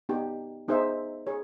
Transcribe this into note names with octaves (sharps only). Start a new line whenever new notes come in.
B3 D#4 G4
B3 D#4 G#4 C5 E5
G#4 C#5